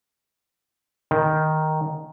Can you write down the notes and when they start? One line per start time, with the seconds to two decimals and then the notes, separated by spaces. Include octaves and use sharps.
1.11 D#3